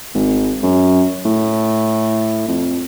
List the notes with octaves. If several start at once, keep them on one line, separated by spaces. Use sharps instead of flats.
G#1
F#2
A2
F2